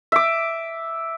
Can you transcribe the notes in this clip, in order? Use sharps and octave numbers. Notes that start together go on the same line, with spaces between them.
E5 D6